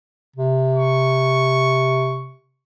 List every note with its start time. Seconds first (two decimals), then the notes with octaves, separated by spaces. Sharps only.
0.36 C3
0.76 C#6